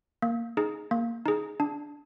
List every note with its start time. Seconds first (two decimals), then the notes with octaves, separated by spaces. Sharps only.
0.22 A#3
0.57 D#4 G#4
0.91 A#3
1.26 D#4 G#4
1.60 D4